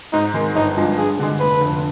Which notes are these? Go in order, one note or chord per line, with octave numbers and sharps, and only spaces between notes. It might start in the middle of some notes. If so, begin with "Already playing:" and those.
G#2 D#4
D#3 G#3
G1 D#4
G2 F3 G#3
G2 G#4
D3 G#3
F1 B4
F2 D3